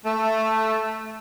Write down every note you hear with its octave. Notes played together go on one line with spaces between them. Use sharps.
A3